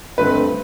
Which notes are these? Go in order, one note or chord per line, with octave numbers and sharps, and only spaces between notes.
G2 D3 A3 C4 B4